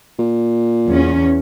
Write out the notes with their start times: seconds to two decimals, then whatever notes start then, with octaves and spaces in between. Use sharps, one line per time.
0.19 A#2
0.89 E2 C#4